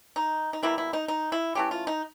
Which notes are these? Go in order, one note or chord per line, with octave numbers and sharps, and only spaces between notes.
D#4
D#4
B2 G3 A#3 E4
E4
D#4
D#4
E4
E3 A3 C#4 G4
F4
D#4